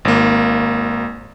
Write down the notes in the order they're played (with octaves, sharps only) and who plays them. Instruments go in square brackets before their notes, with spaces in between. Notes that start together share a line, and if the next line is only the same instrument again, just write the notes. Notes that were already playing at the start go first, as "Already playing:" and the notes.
[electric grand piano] G#1 A#3